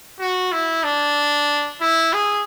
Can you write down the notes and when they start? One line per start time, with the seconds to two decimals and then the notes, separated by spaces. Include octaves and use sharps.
0.20 F#4
0.52 E4
0.84 D4
1.81 E4
2.13 G#4